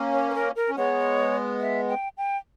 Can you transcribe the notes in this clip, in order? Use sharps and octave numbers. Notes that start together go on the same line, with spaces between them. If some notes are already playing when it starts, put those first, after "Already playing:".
Already playing: A#3 C#4
C#5
B4
A#4
A#4
C#4
G#3 B3 C#5
E5
G5
G5